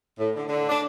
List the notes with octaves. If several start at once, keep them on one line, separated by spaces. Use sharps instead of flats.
A2
D3
D3
D4